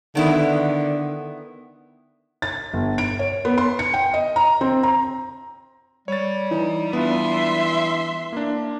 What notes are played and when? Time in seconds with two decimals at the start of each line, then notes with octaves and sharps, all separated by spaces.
0.15 D3 D#3 B3 E4
2.42 A6
2.73 G1
2.98 D7
3.19 C#5
3.45 B3
3.58 C6
3.79 C#7
3.94 G5
4.14 D#5
4.36 A#5
4.61 C4
4.83 A#5
6.08 G3 C#5 A6
6.51 E3 D#4
6.93 B3 D4 F4 E5 C6
8.33 A#3 D4